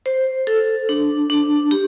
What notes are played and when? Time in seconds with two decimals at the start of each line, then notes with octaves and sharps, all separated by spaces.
0.06 C5
0.47 A4
0.89 D4
1.30 D4
1.71 G4